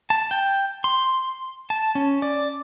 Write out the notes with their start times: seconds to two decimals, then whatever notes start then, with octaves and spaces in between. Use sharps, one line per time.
0.10 A5
0.31 G5
0.84 C6
1.70 A5
1.95 C#4
2.22 D5